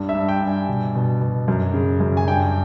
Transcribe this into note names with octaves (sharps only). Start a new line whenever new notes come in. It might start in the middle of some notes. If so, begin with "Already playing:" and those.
Already playing: G2
E5
G2
G5
G2
G#5
B2
B2
B2
F#2
C#3
F#2
G#5
G2 G5